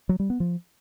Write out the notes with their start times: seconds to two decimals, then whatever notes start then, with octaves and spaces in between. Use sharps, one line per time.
0.09 F#3
0.20 G3
0.30 B3
0.40 F3